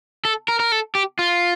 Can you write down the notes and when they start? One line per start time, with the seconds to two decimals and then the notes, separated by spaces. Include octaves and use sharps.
0.25 A4
0.48 A#4
0.60 A#4
0.72 A4
0.95 G4
1.19 F4